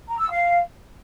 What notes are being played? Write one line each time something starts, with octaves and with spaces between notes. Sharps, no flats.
A#5
E6
F5